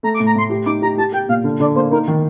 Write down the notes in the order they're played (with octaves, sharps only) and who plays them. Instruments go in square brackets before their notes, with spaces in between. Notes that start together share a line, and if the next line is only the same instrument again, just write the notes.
[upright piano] A3 [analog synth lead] A#5
[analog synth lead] D6
[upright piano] A2
[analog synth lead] A#5
[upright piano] A2 [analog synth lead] C6
[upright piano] G4
[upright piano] D#4 [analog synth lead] D6
[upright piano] G4 [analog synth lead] A#5
[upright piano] G4 [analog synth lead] A5
[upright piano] G4 [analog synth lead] G5
[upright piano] A#2 [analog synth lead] F5
[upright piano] D3
[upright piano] D3 [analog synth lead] D5
[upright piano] A#3 [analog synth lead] C5
[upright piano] D#4 [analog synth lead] A#4
[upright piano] D#3